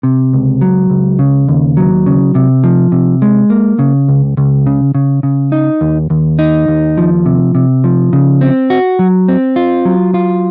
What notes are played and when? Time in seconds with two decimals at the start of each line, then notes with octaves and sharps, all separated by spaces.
0.03 C3
0.33 C#2
0.61 F#3
0.90 C#2
1.19 C#3
1.48 D#2
1.77 F#3
2.06 C#3
2.35 C3
2.64 F3
2.92 C3
3.22 G#3
3.50 A#3
3.79 C#3
4.08 C#2
4.37 C#2
4.66 C#3
4.95 C#3
5.23 C#3
5.52 D#4
5.81 D#2
6.10 D#2
6.39 D#4
6.68 D#2
6.97 F3
7.26 C3
7.55 C3
7.84 F3
8.13 C#3
8.41 C4
8.70 F#4
8.99 F#3
9.28 C4
9.56 F4
9.85 F#3
10.14 F4